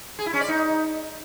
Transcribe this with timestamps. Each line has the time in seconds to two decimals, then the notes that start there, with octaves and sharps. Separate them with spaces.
0.19 G#4
0.26 E4
0.33 C#4
0.41 D5
0.48 D#4